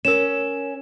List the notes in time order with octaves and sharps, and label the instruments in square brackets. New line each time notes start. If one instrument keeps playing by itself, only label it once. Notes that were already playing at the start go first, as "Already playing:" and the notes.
[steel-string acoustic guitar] C#4 [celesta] A#4 E7